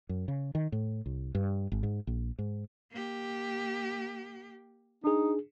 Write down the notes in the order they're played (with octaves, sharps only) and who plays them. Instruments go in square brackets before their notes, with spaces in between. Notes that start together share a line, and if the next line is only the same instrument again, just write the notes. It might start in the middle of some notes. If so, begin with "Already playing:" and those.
[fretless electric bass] F#2
C#3
D#3
A2
C2
G2
G#1
G#2
A#1
G#2
[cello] A#3 G4
[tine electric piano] D4 G#4 [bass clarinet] D#4